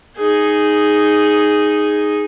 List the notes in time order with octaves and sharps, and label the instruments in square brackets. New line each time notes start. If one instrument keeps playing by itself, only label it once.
[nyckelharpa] D#4 G#4